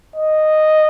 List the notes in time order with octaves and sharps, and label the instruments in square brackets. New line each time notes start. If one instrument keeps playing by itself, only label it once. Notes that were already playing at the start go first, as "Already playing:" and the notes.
[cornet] D#5